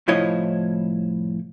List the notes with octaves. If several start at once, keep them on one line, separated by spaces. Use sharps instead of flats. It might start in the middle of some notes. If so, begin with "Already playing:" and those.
C2 A2 F3 E4 C#5 D#5